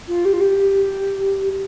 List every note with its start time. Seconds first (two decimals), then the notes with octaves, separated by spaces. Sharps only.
0.08 F4
0.25 G4
0.33 F4
0.41 G4